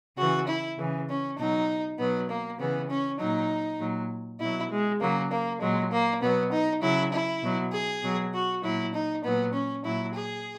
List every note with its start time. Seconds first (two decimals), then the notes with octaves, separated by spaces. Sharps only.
0.17 C#3 E3 F#4
0.47 E4
0.78 C#3 E3
1.09 C#4
1.38 B2 F#3 D#4
1.98 B2 F#3 B3
2.29 A#3
2.59 C#3 E3 B3
2.90 C#4
3.19 A#2 F#3 D#4
3.80 A#2 F#3
4.40 B2 F#3 E4
4.70 G#3
5.00 C#3 F#3 A#3
5.31 A#3
5.61 A#2 F#3 G#3
5.91 A#3
6.22 B2 F#3 B3
6.52 D#4
6.82 C#3 F#3 E4
7.12 E4
7.42 B2 F#3
7.72 G#4
8.03 B2 F#3
8.33 F#4
8.63 A#2 F#3 E4
8.93 D#4
9.24 A#2 F#3 B3
9.53 C#4
9.84 A#2 F#3 E4
10.14 G#4